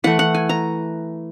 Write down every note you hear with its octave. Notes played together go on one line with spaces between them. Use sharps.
E3 A3 F#5
F#5
G#5
A#5